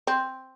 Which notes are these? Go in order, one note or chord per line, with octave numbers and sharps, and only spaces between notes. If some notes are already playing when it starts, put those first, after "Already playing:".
C4